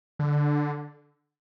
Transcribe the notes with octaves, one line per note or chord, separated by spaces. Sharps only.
D3